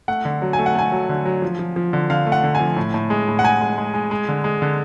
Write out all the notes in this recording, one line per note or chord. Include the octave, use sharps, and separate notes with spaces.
A3 F#5
D3
F#3
G#5
A3
F#5
A3 G#5
F#3
D3
F#3
F3
F3
F3
D3
D3 F5
A3
F#5
D3
F3 G#5
A2
A2
G#3
A2
F#5
G#3 G#5
G#3
G#3
G#3
G#3
D3
G#3
D3